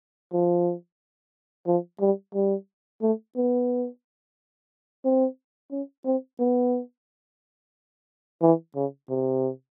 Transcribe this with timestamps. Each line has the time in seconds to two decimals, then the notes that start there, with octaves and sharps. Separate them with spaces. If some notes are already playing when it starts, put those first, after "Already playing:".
0.33 F3
1.67 F3
2.01 G3
2.34 G3
3.02 A3
3.36 B3
5.05 C4
5.71 C#4
6.05 C4
6.40 B3
8.42 E3
8.75 C#3
9.09 C3